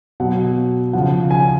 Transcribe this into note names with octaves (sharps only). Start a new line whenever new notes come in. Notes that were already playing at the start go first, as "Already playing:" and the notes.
B2 F#3 F#5
C#3 F3 F#5
G#5